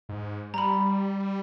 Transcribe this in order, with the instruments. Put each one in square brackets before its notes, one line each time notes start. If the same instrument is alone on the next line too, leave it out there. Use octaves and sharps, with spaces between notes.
[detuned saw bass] G#2
[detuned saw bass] G3 [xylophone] A#5 B5